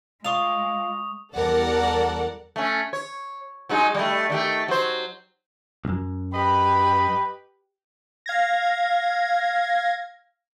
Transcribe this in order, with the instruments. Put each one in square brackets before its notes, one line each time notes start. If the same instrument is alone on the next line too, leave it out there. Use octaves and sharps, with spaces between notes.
[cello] G#3 [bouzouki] F4 F5 [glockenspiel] C#6 D#6 F7
[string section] E2 G3 A4 A#4 D5 F#5
[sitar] A3 C#4
C#5
F#3 G#3 D#4
G3 A3
D#3 A3 G4
F#3 C5
[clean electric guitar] B1 F#2
[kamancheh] G4 B4 [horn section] D#5 B5
[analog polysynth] F5 G#6 A#6